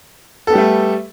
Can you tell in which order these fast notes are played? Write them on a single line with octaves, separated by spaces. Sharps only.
A4 B3 G4 G3 A3